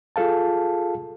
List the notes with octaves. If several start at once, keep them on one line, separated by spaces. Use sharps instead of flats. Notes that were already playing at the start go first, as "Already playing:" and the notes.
F4 G#4 A4 F5 A5